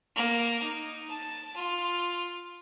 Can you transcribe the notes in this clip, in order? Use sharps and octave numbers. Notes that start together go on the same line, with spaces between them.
A#3
D#4
A5
F4